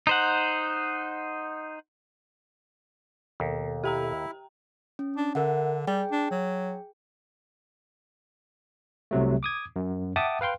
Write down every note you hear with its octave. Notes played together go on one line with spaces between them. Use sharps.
D#4 C5 F#5
D#2 B2 A4
E4 G4 G5 A#5
C#4
D4
D3 A#4 E5 F#5
G3 G#4 G5
D4
F#3
C2 C3 F#3 A3
D6 D#6 G#6
F#2
E5 F#5 G5 A5 D6 D#6
B4 F5 G5 C6